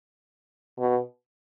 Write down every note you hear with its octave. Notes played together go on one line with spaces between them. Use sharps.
B2